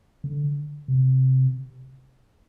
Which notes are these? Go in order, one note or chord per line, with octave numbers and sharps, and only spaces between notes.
D3
C3